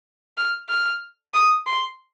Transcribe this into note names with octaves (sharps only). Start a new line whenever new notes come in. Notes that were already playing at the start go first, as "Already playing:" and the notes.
F6
F6
D#6
C6